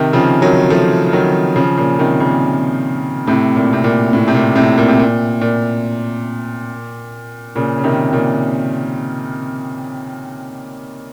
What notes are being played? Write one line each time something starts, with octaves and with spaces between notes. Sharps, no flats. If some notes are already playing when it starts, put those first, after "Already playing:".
Already playing: C3 D#3
C#3 F3
D#3 F#3
F3 A3
D#3 F#3
C#3 F3
A#2 C#3
C3 D#3
A#2 C#3
A2 C3
A#2
C3
A#2
A2
C3
A#2
A2 C3
A#2
C3
A#2
A#2
A#2 C#3
C#3
C3 D#3
A#2 C#3